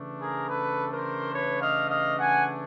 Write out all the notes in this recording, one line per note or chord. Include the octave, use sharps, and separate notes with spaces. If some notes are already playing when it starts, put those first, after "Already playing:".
Already playing: C#3 E3 A3 D4
G#4 A#4
A4 B4
A#4 C5
B4 C#5
D#5 F5
D#5 F5
F#5 G#5